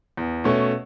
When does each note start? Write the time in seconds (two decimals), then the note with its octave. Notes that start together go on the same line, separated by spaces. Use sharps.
0.17 E2
0.44 B2 A3 C#4